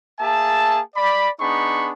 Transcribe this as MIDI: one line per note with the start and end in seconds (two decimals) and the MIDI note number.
0.19 0.80 58
0.19 0.80 68
0.19 0.80 76
0.19 0.80 81
0.96 1.30 74
0.96 1.30 83
1.40 1.92 59
1.40 1.92 62
1.40 1.92 63
1.40 1.92 68
1.40 1.92 83
1.40 1.92 85